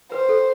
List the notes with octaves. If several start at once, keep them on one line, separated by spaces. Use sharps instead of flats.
B4 C5
A4